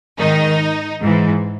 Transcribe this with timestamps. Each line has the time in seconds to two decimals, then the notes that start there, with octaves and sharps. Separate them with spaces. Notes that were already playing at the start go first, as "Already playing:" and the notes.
0.18 G#2 D#3 D#4
0.99 G#2
1.04 E3